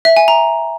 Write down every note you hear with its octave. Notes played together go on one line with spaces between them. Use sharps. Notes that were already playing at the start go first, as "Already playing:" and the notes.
E5
G#5
A#5